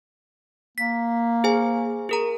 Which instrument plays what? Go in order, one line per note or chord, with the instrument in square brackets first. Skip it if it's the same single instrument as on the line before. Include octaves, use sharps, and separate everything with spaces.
[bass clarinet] A#3 [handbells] B6
[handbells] G#4 C5 G#5
G#4 A#4 A#5